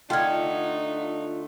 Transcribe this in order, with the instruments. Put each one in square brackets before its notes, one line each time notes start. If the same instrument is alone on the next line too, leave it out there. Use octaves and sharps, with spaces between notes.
[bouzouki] D3 A3 [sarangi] D#4 [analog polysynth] F4 [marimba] G5 F6 G#6